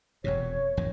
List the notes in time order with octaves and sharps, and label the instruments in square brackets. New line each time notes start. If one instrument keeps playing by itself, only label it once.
[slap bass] E1 F2 C3 [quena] C#5
[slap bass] A1 F2 D#3